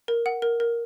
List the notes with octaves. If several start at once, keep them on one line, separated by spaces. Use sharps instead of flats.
A#4
F#5
A#4
A#4